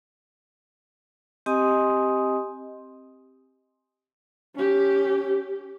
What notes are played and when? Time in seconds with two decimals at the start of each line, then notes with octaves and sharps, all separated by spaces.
1.46 C4 G4 D#5 G#5 C6 D#6
4.55 C#4 G4